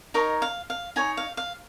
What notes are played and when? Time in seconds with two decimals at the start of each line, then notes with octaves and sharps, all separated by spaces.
0.14 D#4 A#4 C#5 D#5
0.42 F5
0.70 F5
0.96 D#4 C#5 G#5
1.17 F5
1.37 F5